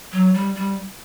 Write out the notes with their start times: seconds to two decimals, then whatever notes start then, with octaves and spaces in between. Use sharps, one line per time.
0.12 F#3
0.34 G3
0.55 G3